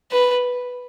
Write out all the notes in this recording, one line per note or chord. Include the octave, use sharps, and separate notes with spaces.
B4